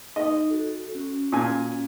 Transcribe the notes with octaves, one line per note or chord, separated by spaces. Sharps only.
D#4 D#5
F#4 A4
C#4 F#4
A#2 G#5